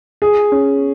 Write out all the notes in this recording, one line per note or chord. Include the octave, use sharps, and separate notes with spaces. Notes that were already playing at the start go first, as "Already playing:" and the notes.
G#4
C#4